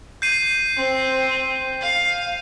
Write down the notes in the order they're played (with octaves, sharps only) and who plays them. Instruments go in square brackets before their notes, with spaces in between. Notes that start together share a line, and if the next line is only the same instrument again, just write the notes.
[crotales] G6 C7 D#7
[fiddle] C4
F5